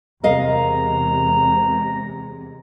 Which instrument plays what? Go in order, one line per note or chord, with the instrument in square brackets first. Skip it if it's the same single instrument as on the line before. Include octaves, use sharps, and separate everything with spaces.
[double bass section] E2 C3 G#3 [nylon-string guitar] A#4 D#5 F5 [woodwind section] A#5